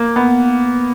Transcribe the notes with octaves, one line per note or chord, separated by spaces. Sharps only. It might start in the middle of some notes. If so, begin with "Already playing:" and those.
Already playing: A#3
B3